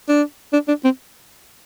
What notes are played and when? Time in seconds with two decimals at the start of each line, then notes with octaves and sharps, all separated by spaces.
0.09 D4
0.53 D4
0.68 D4
0.84 C4